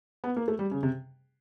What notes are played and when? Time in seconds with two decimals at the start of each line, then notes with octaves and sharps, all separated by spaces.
0.24 B3
0.36 A#3
0.48 A3
0.59 G3
0.71 C#3
0.83 C3